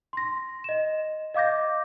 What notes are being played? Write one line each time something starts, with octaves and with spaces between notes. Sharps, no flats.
C6 A#6
D#5 E7
D#5 F5 D6 G6 A#6